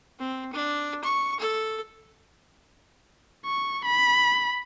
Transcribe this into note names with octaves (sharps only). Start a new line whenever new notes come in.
C4
D4
C#6
A4
C#6
B5